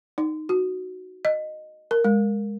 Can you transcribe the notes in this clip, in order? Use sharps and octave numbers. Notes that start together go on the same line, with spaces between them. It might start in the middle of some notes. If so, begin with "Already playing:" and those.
D#4
F#4
D#5
A#4
G#3